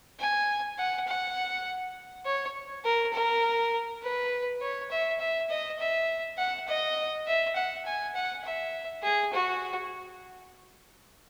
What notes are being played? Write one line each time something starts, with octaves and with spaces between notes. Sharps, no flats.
G#5
F#5
F#5
C#5
A#4
A#4
B4
C#5
E5
E5
D#5
E5
F#5
D#5
E5
F#5
G#5
F#5
E5
G#4
F#4